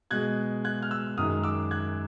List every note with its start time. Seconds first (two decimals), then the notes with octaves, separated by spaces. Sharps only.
0.11 B2 G#3 F#6 G#6
0.65 F#6 G#6
0.83 F6
0.91 E6 F#6
1.17 F#2 D#3 G#3 D#6 F6
1.43 D6 E6
1.71 F#6 G#6